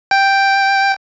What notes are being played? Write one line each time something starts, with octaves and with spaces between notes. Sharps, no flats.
G5